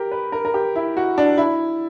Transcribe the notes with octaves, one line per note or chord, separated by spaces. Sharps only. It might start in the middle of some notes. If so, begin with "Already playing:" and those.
Already playing: G4 A#4
B4
A#4
A#4
G4
E4
F#4
D4
E4